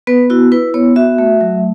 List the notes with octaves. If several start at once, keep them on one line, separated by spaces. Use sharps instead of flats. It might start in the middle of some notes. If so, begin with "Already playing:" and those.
B3 B4
E4 F#4
E4 B4
B3 C#5
F#4 E5
A3
F#3